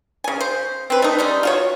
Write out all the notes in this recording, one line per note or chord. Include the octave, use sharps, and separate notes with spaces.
C#3 G#5
C5
C4 B4
A3 D#4
G3 G#3 C#4 D#4
F4 F#4 C#5